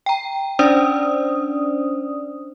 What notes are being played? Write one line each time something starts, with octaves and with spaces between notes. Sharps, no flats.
G5 A#5
C#4 D4 C5 D5 D#6